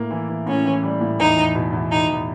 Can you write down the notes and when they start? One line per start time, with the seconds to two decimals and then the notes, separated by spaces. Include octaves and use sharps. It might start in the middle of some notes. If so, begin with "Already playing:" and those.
Already playing: A2 A#3
0.11 E3
0.29 E3
0.47 A2 C#4
0.66 E3
0.83 G3
1.01 A2
1.19 E2 D#4
1.37 E2
1.55 B2
1.73 E2
1.91 E2 D#4
2.09 E2